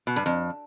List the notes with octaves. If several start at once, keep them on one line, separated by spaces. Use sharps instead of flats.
B2
G2
F2